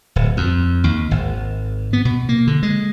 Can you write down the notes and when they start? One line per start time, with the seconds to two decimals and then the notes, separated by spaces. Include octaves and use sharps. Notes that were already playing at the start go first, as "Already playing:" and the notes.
0.16 D1
0.37 F2
0.84 D#2
1.11 G#1
1.93 B3
2.05 B2
2.29 A#3
2.47 D3
2.63 G#3